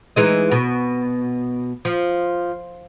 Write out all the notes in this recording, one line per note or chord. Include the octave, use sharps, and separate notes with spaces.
E3 G#3 D#4
B2
F3